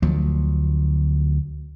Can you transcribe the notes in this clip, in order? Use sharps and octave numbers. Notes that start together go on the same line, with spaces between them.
D2 F3 F#3